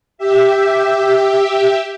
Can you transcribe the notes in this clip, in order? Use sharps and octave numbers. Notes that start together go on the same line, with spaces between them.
G4 E5